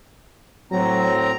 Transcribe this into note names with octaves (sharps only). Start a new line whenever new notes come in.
A2 F#3 C4 A#5